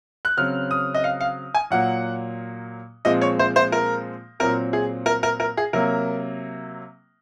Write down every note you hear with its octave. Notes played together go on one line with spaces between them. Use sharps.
F#6
C#3 F#3 C4 F6
D#6
D#5
F5
F5
G#5
A#2 F#3 A#3 F#5
A#2 F3 G#3 C4 D#5
C#5
C5
C5
A#4
A#2 F#3 C4 A#4
G#4
A#4
A#4
A#4
G#4
C3 F#3 A#3 A#4